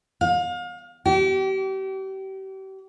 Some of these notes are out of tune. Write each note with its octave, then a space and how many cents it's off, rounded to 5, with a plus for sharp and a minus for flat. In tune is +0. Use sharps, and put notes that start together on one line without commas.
F5 +35
G4 -35